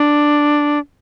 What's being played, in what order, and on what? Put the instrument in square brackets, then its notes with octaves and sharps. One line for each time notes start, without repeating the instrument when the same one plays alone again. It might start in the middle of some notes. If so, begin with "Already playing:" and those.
Already playing: [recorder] D4